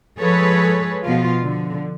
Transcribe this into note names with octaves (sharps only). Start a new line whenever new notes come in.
F3 G#3 G#4 A4 B4 C#5
B2 F3 F4
D3 F3